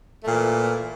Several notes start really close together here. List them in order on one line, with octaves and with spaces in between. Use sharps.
A3 A#2 E3